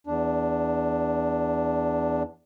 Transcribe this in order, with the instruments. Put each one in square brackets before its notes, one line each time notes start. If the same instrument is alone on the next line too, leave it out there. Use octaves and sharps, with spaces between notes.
[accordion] E2 D4